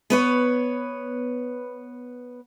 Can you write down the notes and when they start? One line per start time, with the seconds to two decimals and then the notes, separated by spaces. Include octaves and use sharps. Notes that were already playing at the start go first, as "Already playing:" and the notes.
0.10 B3 B4 C#5